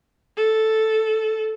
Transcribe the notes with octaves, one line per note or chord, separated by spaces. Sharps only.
A4